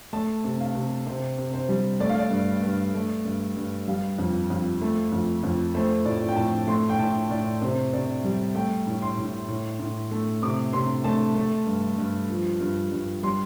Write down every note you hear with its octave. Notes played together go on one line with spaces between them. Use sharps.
A3 A5
C3
F5
C3
C3 C5
C3
C5
G3
A3 D5
F5
D5
G2
G2
A3
G2
G2
G3 F5
F2
F2
A3
F2
F2
A3 C5
A2 D5
G5
A2 A5
A3 C6
G5
A2 A5
A2 D5
C3 C5
C3 D5
G3
A3 G5
A2
C6
A2
A2
A2
A3
C3 D6
C3 C6
A3 A5
A3
G2
G2
F3
G2
G2
G3 C6